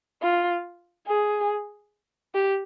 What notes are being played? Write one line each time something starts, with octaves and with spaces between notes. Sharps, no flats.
F4
G#4
G4